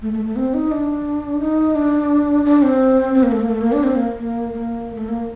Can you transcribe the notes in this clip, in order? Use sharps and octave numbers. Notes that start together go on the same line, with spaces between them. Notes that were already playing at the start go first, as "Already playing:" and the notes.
A3
A3
A3
C4
D#4
D4
D#4
D4
D4
C4
C4
A#3
A3
A#3
A3
A#3
D4
C4
A#3
A#3
A#3
A3
A#3